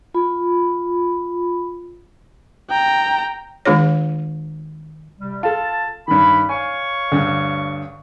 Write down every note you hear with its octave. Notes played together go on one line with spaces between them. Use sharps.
F4 B5
G5 A#5
D#3 G#3 D4 F4 G#4 C#5
C3 G3
F4 A4 A5
G2 D#3 B5
C#5 F5 G#5 C#6
D2 G2